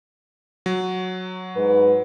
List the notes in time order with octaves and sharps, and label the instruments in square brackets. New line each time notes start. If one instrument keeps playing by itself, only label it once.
[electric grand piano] F#3
[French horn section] G#2 B4